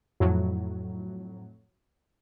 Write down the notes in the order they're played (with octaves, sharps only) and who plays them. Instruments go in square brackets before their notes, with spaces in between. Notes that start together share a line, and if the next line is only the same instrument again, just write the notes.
[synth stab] F2 A2 F#3